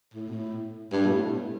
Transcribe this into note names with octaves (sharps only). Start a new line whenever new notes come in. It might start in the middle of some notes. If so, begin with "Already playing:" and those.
A2
B2
A2
G2
B2
A2